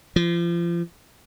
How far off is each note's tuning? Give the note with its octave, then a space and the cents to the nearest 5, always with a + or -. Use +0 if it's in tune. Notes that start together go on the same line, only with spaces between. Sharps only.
F3 -35